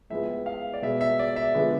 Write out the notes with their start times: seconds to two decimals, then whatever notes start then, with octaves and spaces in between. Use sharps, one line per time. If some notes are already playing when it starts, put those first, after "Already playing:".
0.10 A2 F3 G#3 B3 E5
0.46 F5
0.74 D5
0.82 B2 G#3 B3 E5
1.01 E5
1.19 D5
1.36 E5
1.54 D3 F3 G#3 B3